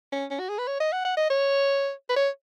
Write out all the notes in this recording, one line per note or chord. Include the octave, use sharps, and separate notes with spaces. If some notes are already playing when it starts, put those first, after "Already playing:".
C#4
C#4
F#4
G#4
B4
C#5
D#5
F#5
F#5
D#5
C#5
B4
C#5